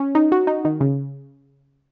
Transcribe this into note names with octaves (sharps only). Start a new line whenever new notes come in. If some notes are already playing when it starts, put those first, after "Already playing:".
Already playing: C#4
D#4
F#4
D#4
D#3
C#3